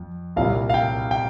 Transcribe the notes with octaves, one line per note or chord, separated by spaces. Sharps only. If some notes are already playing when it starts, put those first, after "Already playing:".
Already playing: F2
C2 A#2 G3 F5
F5
G5
G5